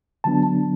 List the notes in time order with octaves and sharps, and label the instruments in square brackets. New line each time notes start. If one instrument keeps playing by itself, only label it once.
[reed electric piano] D3 F#3 B3 D4 A5